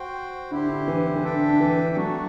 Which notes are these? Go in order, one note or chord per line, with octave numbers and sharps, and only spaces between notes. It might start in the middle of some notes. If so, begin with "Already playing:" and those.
Already playing: F#4 C5 G5
D3 E4 G4 C5
D3
E3
D3
E3
D3 D4 A4 E5 G5
D3
E3
F#3 A3 D4 F#4